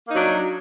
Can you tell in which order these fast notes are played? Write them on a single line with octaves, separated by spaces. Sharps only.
A#3 D#4 F#3 D4